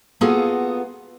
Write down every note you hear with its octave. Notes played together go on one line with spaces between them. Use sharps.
A#3 B3 F4 F#4 G#4 A4